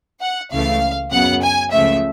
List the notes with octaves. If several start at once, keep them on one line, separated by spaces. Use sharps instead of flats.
F#5
C#2 C#3 E3 A3 F5
F#2 C#3 F#3 B3 F#5
G#5
C#2 C#3 F3 A3 E5